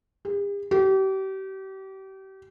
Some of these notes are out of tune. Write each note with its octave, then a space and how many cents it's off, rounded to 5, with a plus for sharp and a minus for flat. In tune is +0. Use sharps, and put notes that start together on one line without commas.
G4 +45
G4 -35